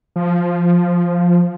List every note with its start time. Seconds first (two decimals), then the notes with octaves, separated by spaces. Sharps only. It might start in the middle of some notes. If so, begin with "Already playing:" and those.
0.16 F3